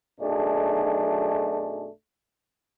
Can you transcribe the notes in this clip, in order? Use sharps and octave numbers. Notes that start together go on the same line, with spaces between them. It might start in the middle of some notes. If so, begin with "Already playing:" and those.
B1 F#2 A3 D4 D#4 G#4